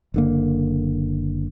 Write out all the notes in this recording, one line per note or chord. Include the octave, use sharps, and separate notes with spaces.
F#1 D3 A#3